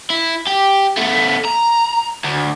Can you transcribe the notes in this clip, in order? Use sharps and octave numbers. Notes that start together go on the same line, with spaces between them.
E4
G4
A3 B3
A#5
D2